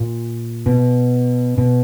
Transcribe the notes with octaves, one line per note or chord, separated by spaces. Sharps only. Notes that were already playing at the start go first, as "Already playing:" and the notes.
Already playing: A#2
B2
B2